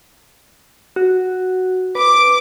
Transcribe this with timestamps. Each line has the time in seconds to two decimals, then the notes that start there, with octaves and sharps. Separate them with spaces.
0.96 F#4
1.95 B4 D6